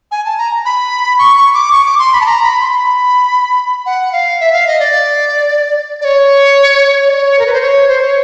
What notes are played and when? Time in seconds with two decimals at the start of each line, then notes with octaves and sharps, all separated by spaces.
0.11 G#5
0.25 A5
0.38 A#5
0.65 B5
1.19 C#6
1.37 C#6
1.54 D6
1.72 C#6
1.86 D6
1.99 C6
2.13 B5
2.21 A5
2.26 A#5
2.43 B5
2.61 C6
2.66 B5
3.86 F#5
4.13 F5
4.40 E5
4.53 F5
4.67 D#5
4.80 D5
6.01 D5
6.05 C#5
7.08 D5
7.11 C#5
7.39 A#4
7.47 B4
7.53 C5
7.61 C#5
7.88 C5
8.01 C#5